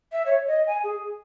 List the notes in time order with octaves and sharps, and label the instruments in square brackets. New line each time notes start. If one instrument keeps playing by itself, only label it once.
[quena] E5
C#5
D#5
G#5
G#4